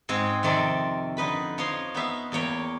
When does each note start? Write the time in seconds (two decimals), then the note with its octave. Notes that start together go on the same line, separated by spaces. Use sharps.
0.09 G#2 C4 F#4 G#4
0.43 F2 C3 D#3 A4 D5
1.17 D3 D#4 B4 B5
1.58 F3 D#4 C#5 F5 C6
1.95 B3 D#4 E5 F5
2.32 E2 A#3 C#5 G5